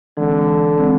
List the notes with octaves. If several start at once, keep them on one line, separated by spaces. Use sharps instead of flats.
D3 E3 G#3 C4
E3 G#3 C4